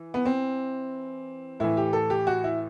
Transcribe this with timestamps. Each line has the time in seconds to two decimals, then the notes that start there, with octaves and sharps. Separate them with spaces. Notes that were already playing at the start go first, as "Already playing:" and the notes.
Already playing: E3
0.14 B3
0.26 C4
1.60 A2 E3 E4
1.77 G4
1.93 A4
2.10 G4
2.27 F#4
2.44 E4